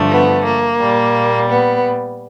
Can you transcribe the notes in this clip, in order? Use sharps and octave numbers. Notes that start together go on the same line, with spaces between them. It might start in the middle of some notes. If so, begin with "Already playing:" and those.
Already playing: G2 D3 F3 A3
B3
A#3
A#2 G3
B3